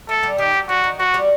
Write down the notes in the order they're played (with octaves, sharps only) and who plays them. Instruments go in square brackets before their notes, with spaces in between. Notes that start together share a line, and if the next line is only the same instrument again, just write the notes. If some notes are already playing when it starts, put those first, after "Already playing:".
[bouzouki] A3 [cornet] A4
[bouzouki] G3
[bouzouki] D#3 [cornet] G4
[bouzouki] F#3
[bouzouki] F#3 [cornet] F#4
[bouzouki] D#3
[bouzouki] F#3 [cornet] F#4
[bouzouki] G3